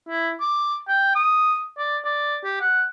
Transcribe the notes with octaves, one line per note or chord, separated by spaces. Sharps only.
E4
D6
G5
D#6
D5
D5
G4
F#5